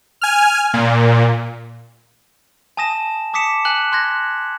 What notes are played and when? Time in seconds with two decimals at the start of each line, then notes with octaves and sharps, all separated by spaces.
0.21 G#5 F6
0.74 A#2
2.77 G#5 A5 D#6 A#6 E7
3.33 A5 D6 D#6 B6 C#7 E7
3.65 G#5 F#6 F#7
3.92 C6 F#6 G#6 A#6